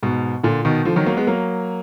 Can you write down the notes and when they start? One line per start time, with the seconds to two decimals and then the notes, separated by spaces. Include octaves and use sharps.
0.03 G#2 B2
0.43 A#2 D3
0.65 B2 D#3
0.85 D3 F3
0.96 D#3 F#3
1.06 F#3 A#3
1.17 G#3 B3
1.27 F#3 A#3